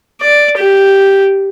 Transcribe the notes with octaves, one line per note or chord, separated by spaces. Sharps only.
D5
G4